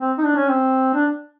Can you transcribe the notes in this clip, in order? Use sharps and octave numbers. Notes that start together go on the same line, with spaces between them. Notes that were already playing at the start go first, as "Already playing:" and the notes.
C4
D#4
D4
C#4
C4
D4